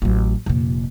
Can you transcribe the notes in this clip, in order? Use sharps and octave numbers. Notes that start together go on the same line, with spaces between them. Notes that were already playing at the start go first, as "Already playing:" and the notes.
A1 F#3
F1 A#2